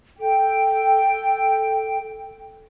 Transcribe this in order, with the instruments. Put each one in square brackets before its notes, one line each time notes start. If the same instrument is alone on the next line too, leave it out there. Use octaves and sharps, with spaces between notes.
[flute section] A4 G5